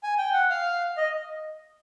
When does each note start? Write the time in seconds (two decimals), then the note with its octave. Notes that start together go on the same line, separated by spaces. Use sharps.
0.03 G#5
0.18 G5
0.34 F#5
0.50 F5
0.97 D#5